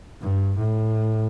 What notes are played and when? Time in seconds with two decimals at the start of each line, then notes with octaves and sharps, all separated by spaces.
0.22 G2
0.57 A2